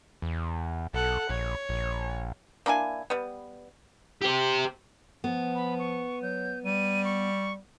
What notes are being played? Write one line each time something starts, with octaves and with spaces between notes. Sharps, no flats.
E2
B1 A4 F#5
A#1 C#5
A#1
A#3 D4 E4 G#5
G3 B3
G4 C5
F3 B3
B5
C#6
F#3 G6
G3 D#7
C#6